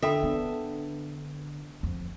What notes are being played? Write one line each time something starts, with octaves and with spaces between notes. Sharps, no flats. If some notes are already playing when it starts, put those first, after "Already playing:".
D3 A4 E5 G5 B5
D3 B3 D4
F2